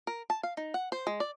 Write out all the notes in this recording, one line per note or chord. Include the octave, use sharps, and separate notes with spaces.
A#4
A5
F5
D#4
F#5
C5
G#3
D5